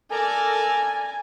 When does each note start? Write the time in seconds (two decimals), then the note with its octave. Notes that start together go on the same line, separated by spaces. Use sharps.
0.11 A4 A#4 D5 G#5